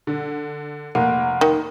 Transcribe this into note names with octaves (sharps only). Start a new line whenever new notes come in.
D3
F1 A#3 F#5
D#3